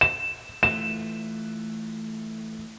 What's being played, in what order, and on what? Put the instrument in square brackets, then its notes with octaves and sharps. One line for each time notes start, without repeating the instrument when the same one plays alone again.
[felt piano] E7
[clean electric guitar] E3 A3 F4 [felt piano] E7